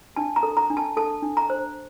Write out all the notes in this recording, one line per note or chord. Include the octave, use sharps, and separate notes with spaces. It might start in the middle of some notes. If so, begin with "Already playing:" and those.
D4 A5
A#5
A4
A#5
D4
A5
A4 A5
D4
A#5
C5